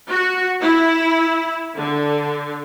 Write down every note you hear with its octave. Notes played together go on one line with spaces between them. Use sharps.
F#4
E4
D3